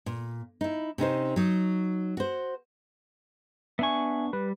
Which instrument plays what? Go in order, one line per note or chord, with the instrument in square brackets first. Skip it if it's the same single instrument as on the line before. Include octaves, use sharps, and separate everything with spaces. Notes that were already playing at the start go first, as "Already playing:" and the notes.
[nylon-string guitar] A#2
D#4 E4
C3 C#4 D#4 C5
F#3 D#4
F#4 C5
[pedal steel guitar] B3 D4 C#6 [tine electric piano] E5 G#5
[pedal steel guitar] G3 [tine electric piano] B4